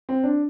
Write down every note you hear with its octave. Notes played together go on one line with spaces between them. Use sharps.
C4
D4